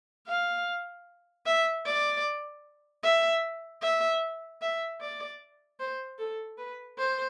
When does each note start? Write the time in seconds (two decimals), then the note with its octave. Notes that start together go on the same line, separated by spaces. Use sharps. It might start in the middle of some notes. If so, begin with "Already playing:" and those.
0.27 F5
1.46 E5
1.86 D5
3.04 E5
3.82 E5
4.61 E5
5.01 D5
5.80 C5
6.19 A4
6.58 B4
6.99 C5